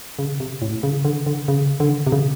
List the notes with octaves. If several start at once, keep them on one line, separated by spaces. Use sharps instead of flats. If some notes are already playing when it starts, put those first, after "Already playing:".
C#3
C3
A2
C#3
D3
D3
C#3
D3
C3
C#3